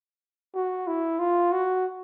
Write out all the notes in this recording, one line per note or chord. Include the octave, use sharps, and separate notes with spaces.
F#4
E4
F4
F#4